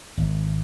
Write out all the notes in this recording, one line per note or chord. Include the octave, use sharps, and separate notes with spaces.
G#1